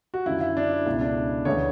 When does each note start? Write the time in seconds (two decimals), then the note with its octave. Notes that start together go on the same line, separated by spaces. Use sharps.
0.14 F#4
0.26 F#2 D3 A3 E4
0.41 E4
0.57 D4
0.71 E4
0.86 C#2 B2 A3 E4
1.01 D4
1.45 D2 C#3 E3 A3 C#5